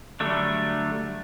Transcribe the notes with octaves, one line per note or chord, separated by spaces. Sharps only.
D3 F#3 G3 A3 D4